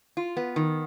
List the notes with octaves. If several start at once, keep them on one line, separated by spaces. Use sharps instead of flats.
F4
B3
D#3